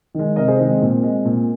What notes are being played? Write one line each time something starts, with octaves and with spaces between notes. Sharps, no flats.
D#3 G#3
C3 A#4 D#5
G#4 C5
D#3 G#3 C4
C4
A#2
G#3
A#2